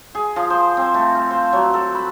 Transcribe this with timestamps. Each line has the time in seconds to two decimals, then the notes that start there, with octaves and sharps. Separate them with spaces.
0.15 G#4
0.36 F3
0.50 C5
0.77 C4
0.94 A3
1.15 F5
1.31 C5
1.53 F#3
1.74 A4
1.95 B5